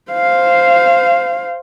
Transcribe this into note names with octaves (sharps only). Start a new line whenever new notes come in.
C5 F5